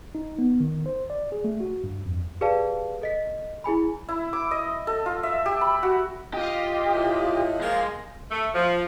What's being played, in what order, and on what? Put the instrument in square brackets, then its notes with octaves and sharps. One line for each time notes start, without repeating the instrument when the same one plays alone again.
[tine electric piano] D#4
B3
D#3
C5
D5
G#4
A3
F#4
G2
F2
[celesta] G4 G#4 B4 D5 F5 A5
A4 D#5 B6
E4 G#4 G#5 B5
[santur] E4
D6
D#5
A4
F4
E5
G4
B5
F#4
[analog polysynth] F4 D#5 [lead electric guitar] G4
[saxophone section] A2
[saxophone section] F3 A#3 [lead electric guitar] G#3
[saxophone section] A3
F3